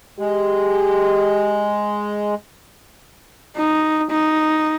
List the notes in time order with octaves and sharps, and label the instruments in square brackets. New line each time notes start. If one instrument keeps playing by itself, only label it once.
[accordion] G#3 [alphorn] G4
[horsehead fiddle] D#4
D#4